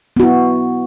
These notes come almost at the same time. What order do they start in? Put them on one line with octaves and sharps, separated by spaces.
B3 F#4 E4